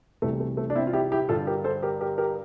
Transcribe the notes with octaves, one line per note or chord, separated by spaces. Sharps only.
C2 C3 E3 A3
A3
A3
D4
C4 E4
F4
E4 G4
E4 G4
G2 D3 F4 A4
G4 A#4
A4 C5
G4 A#4
G4 A#4
G4 A#4